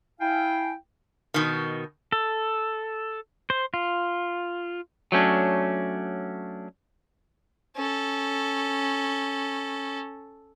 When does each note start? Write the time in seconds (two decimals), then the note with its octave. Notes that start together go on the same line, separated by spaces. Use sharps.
0.20 E4 F5 G5 G#5
1.34 B2 D#3
2.12 A4
3.50 C5
3.74 F4
5.12 F#3 A3 C#4 D4
7.77 C#4 A4